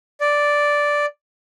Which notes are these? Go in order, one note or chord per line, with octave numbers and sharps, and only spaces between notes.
D5